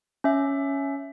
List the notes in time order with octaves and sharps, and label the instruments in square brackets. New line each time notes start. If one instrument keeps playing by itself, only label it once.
[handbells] C#4 E5